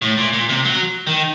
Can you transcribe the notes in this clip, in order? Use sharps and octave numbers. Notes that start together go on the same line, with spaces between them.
A2
A#2
A#2
C3
F#3
D#3